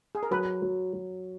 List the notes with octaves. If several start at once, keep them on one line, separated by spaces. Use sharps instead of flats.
G#4
A#4
F#3 B4
F#3
F#3